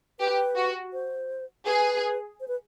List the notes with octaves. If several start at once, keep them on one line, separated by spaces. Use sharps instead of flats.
G4 B4
F#4
C5
G#4 B4
C5
B4